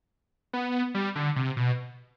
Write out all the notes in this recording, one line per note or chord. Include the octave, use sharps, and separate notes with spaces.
B3
G3
D3
C3
B2